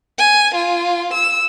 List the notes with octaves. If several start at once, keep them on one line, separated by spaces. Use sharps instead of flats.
G#5
F4
E6